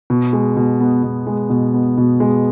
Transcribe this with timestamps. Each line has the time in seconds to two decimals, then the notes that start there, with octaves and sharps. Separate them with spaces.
0.10 B2
0.33 G#3
0.57 B2
0.80 B3
1.03 B2
1.27 G#3
1.50 B2
1.74 B3
1.98 B2
2.20 G#3